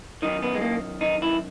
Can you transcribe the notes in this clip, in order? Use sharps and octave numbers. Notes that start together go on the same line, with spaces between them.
F#2 D#3 D#4
B3
G#3
A#3
D#4
E4